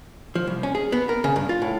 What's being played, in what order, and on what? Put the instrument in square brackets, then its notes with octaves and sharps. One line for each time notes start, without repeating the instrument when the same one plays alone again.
[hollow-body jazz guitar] F3
C2
C#4
G#4
B3
A#4
C#3
G2
F4
A2